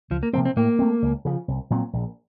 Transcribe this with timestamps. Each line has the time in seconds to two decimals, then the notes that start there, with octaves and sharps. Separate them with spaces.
0.10 C#2 F3
0.23 A#3
0.33 C3 F3 A#3 C4
0.45 C4
0.56 A2 A#3
0.79 A3 C4
1.02 C#2
1.25 C#3 F3
1.48 C2
1.70 A#2 F#3 C4
1.93 A#1